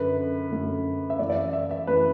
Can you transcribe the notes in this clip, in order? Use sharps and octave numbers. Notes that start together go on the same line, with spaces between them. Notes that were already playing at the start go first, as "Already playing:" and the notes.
Already playing: F#2 D3 B4
F#2 D3
E5
F#2 E3 D5
D5
E5
E5
E5
F#2 E3 B4